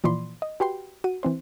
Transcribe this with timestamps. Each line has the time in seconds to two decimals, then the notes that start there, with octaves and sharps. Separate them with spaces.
0.04 A#2 E3 F3 D5 B5 C6
0.42 D#5
0.60 F#4 G4 B4 G5 C6
1.04 F#4 D#7
1.23 E3 C4 C5